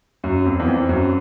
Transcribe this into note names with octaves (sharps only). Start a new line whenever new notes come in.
F#2
F2
E2
F2
F#2